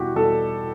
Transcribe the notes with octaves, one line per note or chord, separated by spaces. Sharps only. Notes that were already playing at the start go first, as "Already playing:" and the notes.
Already playing: E2 B2 G3 E4 F#4 G4
E2 B2 G3 A4